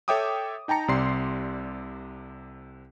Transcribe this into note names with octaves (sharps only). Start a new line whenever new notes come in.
A4 C#5 E5 G5 D6 D#6
D#4 G5 A5 A#5 C#7
C2 C3 D5 C6 C7